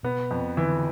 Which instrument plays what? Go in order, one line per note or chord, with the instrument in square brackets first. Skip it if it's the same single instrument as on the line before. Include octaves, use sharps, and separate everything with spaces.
[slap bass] B2 [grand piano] B3
[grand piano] F2
[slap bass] D3 [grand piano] E3